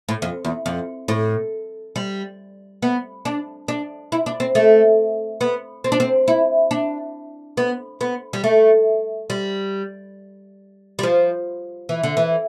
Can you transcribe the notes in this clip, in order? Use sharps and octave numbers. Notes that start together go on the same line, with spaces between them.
A2
F2
E2
F2
A2
G3
B3
D4
D4
E4
D4
C4
A3
B3
C4
D4
C4
E4
D4
B3
B3
G3
A3
G3
G3
F3
E3
D3
E3